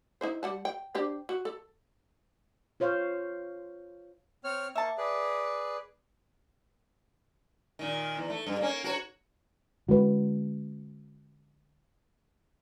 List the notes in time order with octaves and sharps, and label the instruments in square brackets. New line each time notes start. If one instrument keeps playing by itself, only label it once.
[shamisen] D#4 E4 C5
G3 F#5 A5
G5
D4 G4 C5
F#4
A4
[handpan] F4 C5 C#5 F5
[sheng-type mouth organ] C4 C#5 F6
[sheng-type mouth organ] A#3 C#6 [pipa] E5 A5
[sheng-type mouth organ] G#4 B4 D5
[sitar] A#2 D#3
E2
A3
G2
A#3 C#4
F#4 A#4 C#5
[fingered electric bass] D3 G#3 C#4 [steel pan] F#4 B4